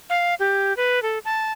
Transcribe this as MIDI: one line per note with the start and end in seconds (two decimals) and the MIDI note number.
0.10 0.35 77
0.40 0.76 67
0.77 1.02 71
1.03 1.19 69
1.25 1.52 81